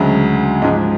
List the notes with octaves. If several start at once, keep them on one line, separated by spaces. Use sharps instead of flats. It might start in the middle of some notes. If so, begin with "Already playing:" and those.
Already playing: D2 C#3 F#3 G#3
G#2 F3 G#3
G#3